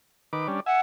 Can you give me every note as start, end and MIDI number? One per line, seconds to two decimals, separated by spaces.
0.33 0.47 51
0.33 0.47 71
0.33 0.47 86
0.48 0.60 55
0.48 0.60 61
0.48 0.60 62
0.66 0.81 76
0.66 0.80 78
0.66 0.81 80